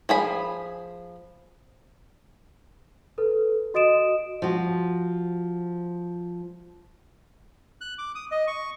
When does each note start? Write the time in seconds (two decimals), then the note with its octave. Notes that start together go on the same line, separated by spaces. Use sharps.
0.09 F3 G#4 B5
3.18 A4 B4
3.74 F#4 D#5 D#6 D7 E7
4.42 F3 F#4
7.81 F#6
7.98 D6
8.15 D#6
8.31 D#5
8.47 C#6